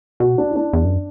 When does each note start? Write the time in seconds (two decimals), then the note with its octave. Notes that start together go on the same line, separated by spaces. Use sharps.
0.20 B2 F#4
0.38 D4
0.50 E4
0.56 D4
0.73 E2
0.85 F#2